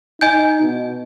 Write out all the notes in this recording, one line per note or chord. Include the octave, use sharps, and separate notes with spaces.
D#4 D#5 G#5 G6
B2